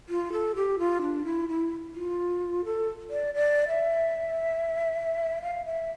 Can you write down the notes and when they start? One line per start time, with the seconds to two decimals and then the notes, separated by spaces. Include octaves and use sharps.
0.09 F4
0.32 A4
0.56 G4
0.79 F4
1.01 D4
1.25 E4
1.49 E4
1.94 F4
2.65 A4
3.10 D5
3.35 D5
3.68 E5
5.42 F5
5.66 E5